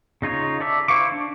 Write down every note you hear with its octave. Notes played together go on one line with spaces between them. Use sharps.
C#3 D#4 F4 C#5
A4 D5 E5
E4 C5 F5 C#6 D6
D4